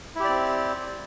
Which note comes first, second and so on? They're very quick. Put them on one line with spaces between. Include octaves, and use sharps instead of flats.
E4 G4 D5 C4